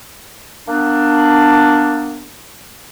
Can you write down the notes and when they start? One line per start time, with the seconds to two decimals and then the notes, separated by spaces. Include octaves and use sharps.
0.68 A#3 B3 D4